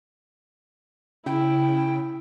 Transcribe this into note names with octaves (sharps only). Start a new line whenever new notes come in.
C#3 E4 G5